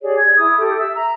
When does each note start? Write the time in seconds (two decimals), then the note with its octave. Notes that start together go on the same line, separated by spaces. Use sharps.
0.02 G4 G#4 C#5 D5
0.17 G#6
0.36 E4 D#6
0.58 G4 A4
0.77 E5 E6
0.96 A#5